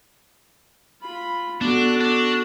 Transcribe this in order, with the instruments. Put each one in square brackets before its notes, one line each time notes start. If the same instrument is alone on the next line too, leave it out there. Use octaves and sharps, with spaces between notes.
[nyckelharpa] F4 B5
[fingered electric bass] B3 [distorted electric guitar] D4 [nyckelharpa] F#4 A4
[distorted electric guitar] D4